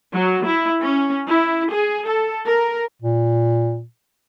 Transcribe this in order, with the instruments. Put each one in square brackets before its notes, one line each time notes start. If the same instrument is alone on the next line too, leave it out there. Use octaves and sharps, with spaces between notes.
[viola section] F#3
E4
C#4
E4
G#4
A4
A#4
[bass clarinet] A#2